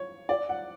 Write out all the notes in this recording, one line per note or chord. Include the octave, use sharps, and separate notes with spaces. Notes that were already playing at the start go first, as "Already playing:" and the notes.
Already playing: C#5
D5
F#5